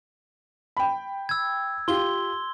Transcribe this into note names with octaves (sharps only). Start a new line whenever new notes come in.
G5 B5
E6 G#6
F4 G4 C6 G7